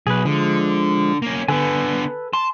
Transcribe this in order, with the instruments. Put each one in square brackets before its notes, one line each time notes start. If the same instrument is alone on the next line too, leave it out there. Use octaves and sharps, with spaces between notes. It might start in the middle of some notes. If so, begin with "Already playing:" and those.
[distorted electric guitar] B1 [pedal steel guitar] G#4 B4
[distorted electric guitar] D3 [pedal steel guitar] F3 G#3
[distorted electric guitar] A#3 C#4
[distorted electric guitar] D3 B3 [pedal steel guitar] A4 B4 G#5
[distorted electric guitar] A5 [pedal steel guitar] C6